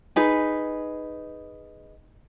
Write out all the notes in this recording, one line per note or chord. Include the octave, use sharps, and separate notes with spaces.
D#4 G#4 B4